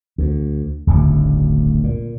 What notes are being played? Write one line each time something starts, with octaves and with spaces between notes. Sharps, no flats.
D2
D1 G1 D2 C#3
A#2